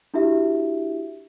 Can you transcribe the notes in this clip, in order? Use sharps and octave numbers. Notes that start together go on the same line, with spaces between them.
D4 E4 F#4 G4 E5